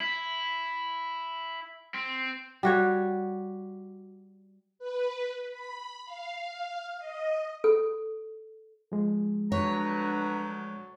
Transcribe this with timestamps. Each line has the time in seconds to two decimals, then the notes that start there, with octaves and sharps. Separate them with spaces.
0.01 E4
1.94 C4
2.63 G3 F#4 C#5
4.79 B4
5.51 B5
6.06 F5
6.99 D#5
7.64 A4
8.92 F3 G#3
9.52 D2 F#3 D4 B4 C#5 A#5